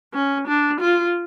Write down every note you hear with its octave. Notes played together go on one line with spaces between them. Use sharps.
C#4
D4
F4